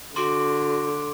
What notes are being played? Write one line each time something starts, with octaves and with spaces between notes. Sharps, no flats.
D3 F#4 C6 D6 D7